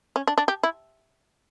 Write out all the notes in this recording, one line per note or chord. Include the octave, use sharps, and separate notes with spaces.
C#4
D4
D4
G4
E4